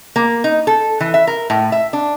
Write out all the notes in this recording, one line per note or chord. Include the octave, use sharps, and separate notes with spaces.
A#3
D#4
A4
E3
E5
A#4
A2
E5
D4